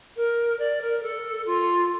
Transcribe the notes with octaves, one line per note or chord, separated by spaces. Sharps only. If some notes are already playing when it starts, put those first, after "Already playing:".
A#4
D5
A#4
A4
F4